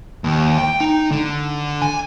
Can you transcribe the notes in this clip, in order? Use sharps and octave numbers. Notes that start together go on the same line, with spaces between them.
D#2
G5
D#4
D3
G#5